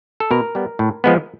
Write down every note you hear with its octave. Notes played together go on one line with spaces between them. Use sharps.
A4
B2 A#4
G3 B3
A2
F3 G#3 B3